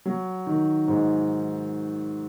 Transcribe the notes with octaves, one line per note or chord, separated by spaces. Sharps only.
F#3
D#3
G#2